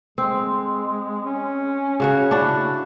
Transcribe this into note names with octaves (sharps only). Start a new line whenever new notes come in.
G#3 C4
C#4
C#3 F#4 C#5
D4 E4 F#4